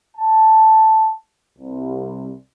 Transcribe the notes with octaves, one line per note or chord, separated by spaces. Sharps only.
A5
C2